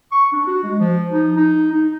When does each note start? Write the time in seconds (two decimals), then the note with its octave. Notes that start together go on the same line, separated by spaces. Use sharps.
0.12 C#6
0.32 D4
0.47 F#4
0.64 G#3
0.80 F3
1.12 D#4
1.37 D#4
1.72 D#4